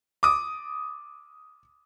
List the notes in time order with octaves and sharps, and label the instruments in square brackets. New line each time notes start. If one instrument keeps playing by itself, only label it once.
[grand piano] D6 D#6